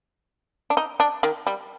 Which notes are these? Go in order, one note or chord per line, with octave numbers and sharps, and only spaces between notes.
D4
D#4
D4
D#3
G3